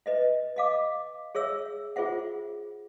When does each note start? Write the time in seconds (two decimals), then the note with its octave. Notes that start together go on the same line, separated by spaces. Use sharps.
0.06 B4 D#5 E5
0.56 D#5 F5 D6
1.35 G#4 C#5 E5 E6
1.96 F4 G#4 C5 E5 F#5